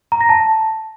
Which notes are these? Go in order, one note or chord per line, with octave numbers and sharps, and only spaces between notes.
A#5
A#6
A5